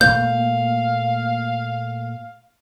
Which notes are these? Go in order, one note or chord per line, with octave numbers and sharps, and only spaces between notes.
A#2 A3 A#3 F5 G6